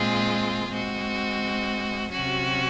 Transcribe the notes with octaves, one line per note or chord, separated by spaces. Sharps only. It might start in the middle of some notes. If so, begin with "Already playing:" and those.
Already playing: A#2 G#3 C4 F4 G#4
G#3 C4 F#4
C3 F#3 C#4 F#4